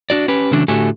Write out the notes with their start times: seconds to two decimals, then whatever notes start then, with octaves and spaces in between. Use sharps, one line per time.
0.10 D4 F#4 D5
0.28 C#4 G4 B4
0.51 C#3 E3 F#3 A3 C#4 D4
0.68 A2 D3 A3 F#4 G4 G#5